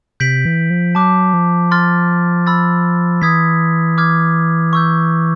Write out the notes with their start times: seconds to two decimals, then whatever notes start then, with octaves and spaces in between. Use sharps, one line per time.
0.20 C3 G6 B6 D7 F#7
0.45 E3
0.70 F3
0.95 F#3 A5 D6 F#6
1.33 F3
1.71 C6 F6 A6
2.47 B5 E6 A6
3.22 E3 D#6 G#6 B6
3.98 D6 F6 G#6
4.73 C#6 E6 G6